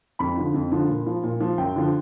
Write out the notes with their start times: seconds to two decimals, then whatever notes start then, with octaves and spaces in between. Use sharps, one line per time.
0.19 F2 B5
0.37 D3 F3
0.54 F2
0.72 D3 F3
0.89 A#2
1.07 F3
1.24 A#2
1.41 F3
1.58 F#2 G5
1.76 D3 F3